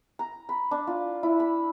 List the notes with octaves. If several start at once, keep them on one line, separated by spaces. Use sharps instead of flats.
A#5
B5
D4
F4
E4
B5